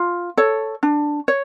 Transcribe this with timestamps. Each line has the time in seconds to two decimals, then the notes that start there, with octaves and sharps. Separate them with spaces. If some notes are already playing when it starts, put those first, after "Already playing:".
Already playing: F4
0.37 A4 C#5
0.83 D4
1.28 C#5